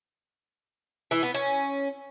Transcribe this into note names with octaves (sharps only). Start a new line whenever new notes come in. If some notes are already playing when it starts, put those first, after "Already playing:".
E3
B3
C#4